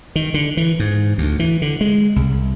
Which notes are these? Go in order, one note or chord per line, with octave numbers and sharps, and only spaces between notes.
D#3
D3
E3
G#2
D2
E3
D3
G#3
C2